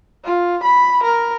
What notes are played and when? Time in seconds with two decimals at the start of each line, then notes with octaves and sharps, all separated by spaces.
0.24 F4
0.64 B5
1.04 A#4